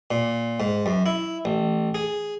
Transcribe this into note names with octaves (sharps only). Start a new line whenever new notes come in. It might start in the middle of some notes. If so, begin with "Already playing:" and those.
A#2
G#2
F#2
E4
A1
G#4